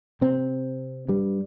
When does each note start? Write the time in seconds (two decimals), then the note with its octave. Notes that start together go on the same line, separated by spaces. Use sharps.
0.21 C3 C4
1.08 G2 G3